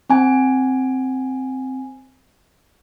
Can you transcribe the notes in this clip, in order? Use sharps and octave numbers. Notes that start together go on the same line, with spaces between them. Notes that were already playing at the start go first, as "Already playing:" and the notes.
C4 G#5